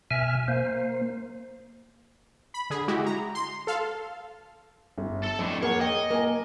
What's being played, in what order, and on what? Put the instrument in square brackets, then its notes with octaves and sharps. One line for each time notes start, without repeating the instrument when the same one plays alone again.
[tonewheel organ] B2 E5 G#5 F6
A#3 C5
[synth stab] B5
D3 G#4
G#3 E4 F#4 G4
A#5
C6
A4 F5
[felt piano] G1
[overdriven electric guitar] A4 A5
[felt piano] F2 [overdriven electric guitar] A2 D3
[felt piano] A#3 G#4 F#5 [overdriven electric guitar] C#5
[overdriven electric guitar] D#5 [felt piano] G5
[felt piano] A#3 G#5